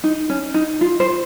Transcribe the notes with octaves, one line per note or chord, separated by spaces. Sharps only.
D#4
C#4
D#4
F4
C5